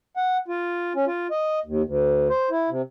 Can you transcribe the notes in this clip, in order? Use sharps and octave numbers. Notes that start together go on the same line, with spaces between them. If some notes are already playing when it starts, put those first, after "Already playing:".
F#5
F4
C#4
F4
D#5
D#2
D2
C5
E4
C3